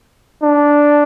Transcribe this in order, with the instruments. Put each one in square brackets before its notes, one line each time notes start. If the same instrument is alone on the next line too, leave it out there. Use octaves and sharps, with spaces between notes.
[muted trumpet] D4